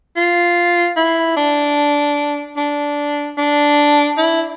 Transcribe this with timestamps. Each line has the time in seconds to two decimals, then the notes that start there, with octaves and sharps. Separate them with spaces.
0.16 F4
0.97 E4
1.36 D4
2.57 D4
3.38 D4
4.17 E4